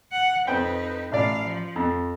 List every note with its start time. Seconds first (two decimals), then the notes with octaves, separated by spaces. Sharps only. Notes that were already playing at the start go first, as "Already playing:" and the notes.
0.12 F#5
0.47 F2 D#4 B4 C5 G5
1.12 A1 A3 D5 F5
1.43 F3
1.76 F2